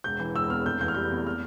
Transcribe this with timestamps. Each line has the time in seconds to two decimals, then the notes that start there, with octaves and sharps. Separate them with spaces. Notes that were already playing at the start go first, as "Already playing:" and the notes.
0.04 E1 G6
0.20 E3
0.35 E1 E6
0.50 E2 F6
0.66 F1 G6
0.81 E3 G6
0.88 F6
0.94 G3 G6
1.11 E2
1.27 F6